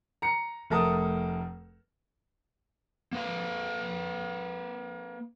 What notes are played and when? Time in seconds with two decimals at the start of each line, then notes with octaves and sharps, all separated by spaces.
0.22 A#5 C#7
0.70 F1 A3 A#4 A5 D#6
3.13 A#3 B4 F5